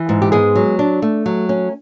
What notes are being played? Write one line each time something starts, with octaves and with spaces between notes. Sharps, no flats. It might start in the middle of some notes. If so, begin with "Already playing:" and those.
Already playing: E3
G#2
G4
G#3 B3 G#4
F#3
D4
A3
F#3
C#4